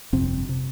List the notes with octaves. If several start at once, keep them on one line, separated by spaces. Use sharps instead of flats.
G1 F2 C3 C4
C3